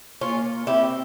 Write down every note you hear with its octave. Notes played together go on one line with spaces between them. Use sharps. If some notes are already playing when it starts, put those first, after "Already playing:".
A#3 C#4 F4
C4 E4 G4